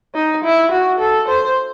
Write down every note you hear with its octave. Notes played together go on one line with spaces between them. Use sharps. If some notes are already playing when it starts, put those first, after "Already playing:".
D#4
E4
F#4
A4
C5